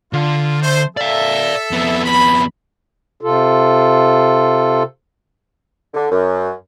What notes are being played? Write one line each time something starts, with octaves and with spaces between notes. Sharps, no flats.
D3 F4
A3 C5
A4 D5 E5 F5
F2 B3
B5
C3 F4 A4
D3
F#2